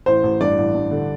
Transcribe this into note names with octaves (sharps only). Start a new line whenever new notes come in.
A1 C5
A1
G2 D5
A1
G2
D3